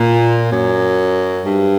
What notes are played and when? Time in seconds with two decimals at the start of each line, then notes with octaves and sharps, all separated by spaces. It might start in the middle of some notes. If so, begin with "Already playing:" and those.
Already playing: A#2
0.51 F#2
1.46 G2